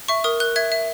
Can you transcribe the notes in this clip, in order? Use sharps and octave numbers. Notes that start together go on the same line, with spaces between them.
E5 C#6
A#4 D#6
A#4 F#6
E5 G#6
E5